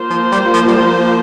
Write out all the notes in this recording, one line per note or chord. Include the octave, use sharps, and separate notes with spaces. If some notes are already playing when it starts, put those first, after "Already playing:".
Already playing: A#3 F4 C5
F3
G3
F3
G3
F3